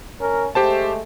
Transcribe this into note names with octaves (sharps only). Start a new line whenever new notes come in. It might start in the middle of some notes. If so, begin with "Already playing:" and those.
C#4 A#4
G#3 A3 G4 C5 A5